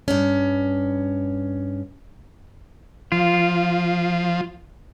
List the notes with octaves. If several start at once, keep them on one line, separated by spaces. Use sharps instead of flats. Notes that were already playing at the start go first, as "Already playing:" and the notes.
G2 C#4
F3 F4